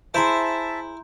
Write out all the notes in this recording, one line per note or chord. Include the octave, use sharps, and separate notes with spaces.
E4 G#4 C5 E5 A5 A#5 C6 G6